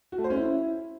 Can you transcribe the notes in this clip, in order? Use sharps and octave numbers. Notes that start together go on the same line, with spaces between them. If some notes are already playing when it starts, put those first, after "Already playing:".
F#4
A3
C5
C#4
E4